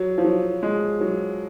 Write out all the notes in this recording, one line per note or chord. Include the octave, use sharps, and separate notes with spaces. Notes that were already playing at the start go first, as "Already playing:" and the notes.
Already playing: F#3
F3
F#3
G#3
F#3